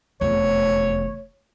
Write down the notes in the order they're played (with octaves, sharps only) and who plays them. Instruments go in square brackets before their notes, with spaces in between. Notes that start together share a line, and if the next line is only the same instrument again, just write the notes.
[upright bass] F1 E2 [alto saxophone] C#5